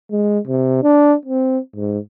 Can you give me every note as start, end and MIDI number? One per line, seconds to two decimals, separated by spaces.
0.11 0.39 56
0.48 0.80 48
0.83 1.15 62
1.25 1.59 60
1.76 1.99 44